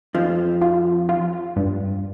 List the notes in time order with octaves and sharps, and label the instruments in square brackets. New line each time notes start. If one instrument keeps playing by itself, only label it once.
[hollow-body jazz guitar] F2 F3 [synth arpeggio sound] F4
[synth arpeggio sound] F4
F4
G2